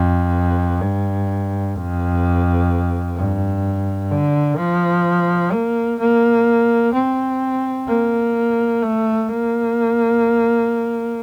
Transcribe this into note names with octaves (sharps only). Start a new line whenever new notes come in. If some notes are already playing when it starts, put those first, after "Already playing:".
Already playing: F2
G2
F2
G2
D3
F3
A#3
A#3
C4
A#3
A3
A#3